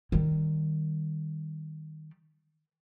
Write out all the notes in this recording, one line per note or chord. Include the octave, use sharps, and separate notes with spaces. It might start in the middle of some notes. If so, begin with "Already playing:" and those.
D#3 G3